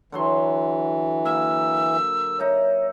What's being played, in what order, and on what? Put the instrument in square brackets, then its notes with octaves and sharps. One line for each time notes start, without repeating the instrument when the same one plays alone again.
[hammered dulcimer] D3 F#3 C6 [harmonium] E3
[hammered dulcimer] A#3 [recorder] E6
[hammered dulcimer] D#4 E5 A#5 [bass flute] C#5